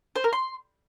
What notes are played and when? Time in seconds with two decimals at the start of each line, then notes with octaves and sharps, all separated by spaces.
0.16 C5
0.24 A#4
0.33 C6